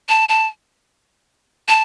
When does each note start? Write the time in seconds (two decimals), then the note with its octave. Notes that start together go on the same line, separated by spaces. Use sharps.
0.09 A5
0.29 A5
1.68 A5